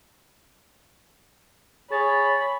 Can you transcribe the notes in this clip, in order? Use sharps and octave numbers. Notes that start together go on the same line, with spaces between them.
G#4 C#5 B5 A6